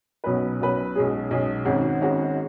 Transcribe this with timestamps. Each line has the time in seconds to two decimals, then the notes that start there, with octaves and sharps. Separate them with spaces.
0.24 B1 B2 F#3 C#4 B4
0.60 B1 B2 F#3 C#4 B4
0.95 B1 B2 G#3 C#4 G#4
1.30 B1 B2 G#3 C#4 G#4
1.65 G#1 G#2 G#3 C#4 F#4
2.01 G#1 G#2 G#3 C#4 F#4